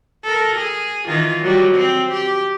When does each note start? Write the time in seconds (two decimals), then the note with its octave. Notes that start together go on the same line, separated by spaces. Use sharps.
0.24 A4 A#4
0.56 G#4
1.08 D#3 E3 F4
1.42 F#3 G3
1.75 C4
2.12 G4